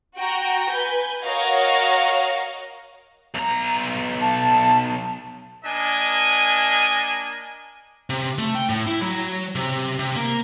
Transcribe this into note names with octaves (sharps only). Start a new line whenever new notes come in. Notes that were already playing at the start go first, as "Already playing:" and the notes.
F#4 G5 A#5
B4 G#5 G6
F#4 A#4 C#5 D#5 F5
B1 A#5
A5
A#3 D4 D#5 G#5
C3
A3
G5
A2
E4
F#3
C3
C3
A#3